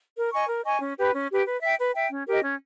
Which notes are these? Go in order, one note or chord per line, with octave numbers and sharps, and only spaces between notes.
A#4
D#5 G#5 C#6
A#4
D#5 G#5 C#6
C#4
G4 B4
C#4
G4 B4
B4
E5 G5
B4
E5 G5
C#4
G4 A#4 D#5
C#4